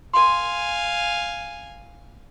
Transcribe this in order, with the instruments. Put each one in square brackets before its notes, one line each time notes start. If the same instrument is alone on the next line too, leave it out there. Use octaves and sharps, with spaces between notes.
[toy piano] A#4 C6 [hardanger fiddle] F5 G#5